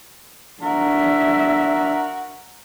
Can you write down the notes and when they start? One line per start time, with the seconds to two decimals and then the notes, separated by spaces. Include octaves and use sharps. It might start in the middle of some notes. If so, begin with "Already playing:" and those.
0.63 D4 F#4 A#4 E5